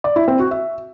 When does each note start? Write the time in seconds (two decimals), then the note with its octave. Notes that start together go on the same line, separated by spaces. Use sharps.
0.04 D5
0.16 E4
0.28 C4
0.39 F#4
0.51 E5